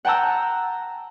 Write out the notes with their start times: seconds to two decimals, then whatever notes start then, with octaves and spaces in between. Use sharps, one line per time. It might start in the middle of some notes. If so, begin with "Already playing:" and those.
0.05 F#5 G5 A5 A#5 E6